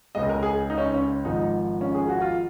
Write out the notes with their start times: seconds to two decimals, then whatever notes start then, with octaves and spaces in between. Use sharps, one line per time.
0.15 C#2 C#3 G#3 D#5
0.29 A#4
0.43 G#4
0.70 D#4
0.78 C#4
0.94 C#4
1.25 G#1 G#2 F3 D#4
1.81 C#4
1.94 G#4
2.09 F#4
2.21 F4